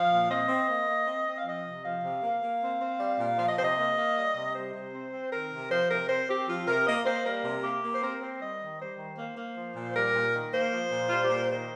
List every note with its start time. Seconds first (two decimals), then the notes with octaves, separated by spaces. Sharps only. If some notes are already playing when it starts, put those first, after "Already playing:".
Already playing: F3 F5
0.11 A#2
0.29 C4 D#5
0.48 C4
0.68 A#3
0.88 A#3
1.07 C4
1.26 C4
1.36 F5
1.45 F3 D#5
1.65 C3
1.83 F3 F5
2.03 C3
2.22 A#3
2.42 A#3
2.62 C4
2.81 C4
3.00 G3
3.19 A#2
3.38 F3 F5
3.48 D#5
3.56 C3 C5
3.64 D#5
3.76 A#3
3.97 A#3
4.16 G3
4.35 C3
4.54 G3 C5
4.74 C3
4.93 C4
5.12 C4
5.31 D#3 A#4
5.51 C3
5.70 F3 C5
5.89 C3 A#4
6.08 C4 C5
6.27 C4 G4
6.47 F3 F4
6.66 C3 A#4
6.86 A#3 D#5
7.05 A#3 C5
7.24 G3 A#4
7.43 C3
7.63 A#3 G4
7.83 A#3
7.93 C5
8.01 C4 A#4
8.20 C4 C5
8.40 G3 D#5
8.59 D#3
8.78 G3 C5
8.98 D#3
9.17 A#3 C5
9.37 A#3
9.56 F3
9.76 A#2
9.94 G3 A#4
10.14 A#2
10.34 D#3
10.52 A#3 C5
10.72 F3
10.91 A#2
11.08 G3 F4
11.22 G4
11.29 A#2
11.35 A#4
11.49 D#3 C5